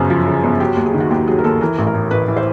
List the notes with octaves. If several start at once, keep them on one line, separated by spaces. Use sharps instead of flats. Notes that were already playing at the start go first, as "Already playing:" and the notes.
Already playing: G1 F#2 C#3 C5
F3
C#3
G1
F#3 G4
D#2
G#4
D#3
F#4
D#2 G4
F#3 G#4
A#4
D#2 A4
E3 A#4
A1
A#4
A2
A1 B4
E3
C5